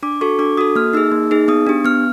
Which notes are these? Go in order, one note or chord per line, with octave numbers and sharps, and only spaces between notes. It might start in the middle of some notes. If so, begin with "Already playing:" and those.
D4 D6
F#4 A4 C#6
D4 D6
F#4 A4 D#6
A#3 F6
D#4 G#4 E6
A#3
D#4 G#4
B3 D#6
D4 G4
B3 F6